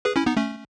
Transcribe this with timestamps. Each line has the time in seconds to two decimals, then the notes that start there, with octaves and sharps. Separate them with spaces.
0.05 G#4 B4
0.16 C#4 E4
0.26 B3 D#4
0.36 A3 C#4